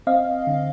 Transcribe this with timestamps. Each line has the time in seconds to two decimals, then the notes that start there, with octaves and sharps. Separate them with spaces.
0.07 C4 D#5 F5
0.47 D3